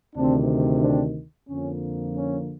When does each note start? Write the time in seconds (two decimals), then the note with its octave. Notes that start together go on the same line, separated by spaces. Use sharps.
0.15 D2 C3 D#3 C4 D4
0.83 C4 D4
1.49 F2 D3 F3 A#3 C#4
2.17 C#4